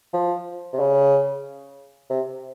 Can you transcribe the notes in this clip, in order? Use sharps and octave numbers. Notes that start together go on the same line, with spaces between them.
F3
C3
C#3
C3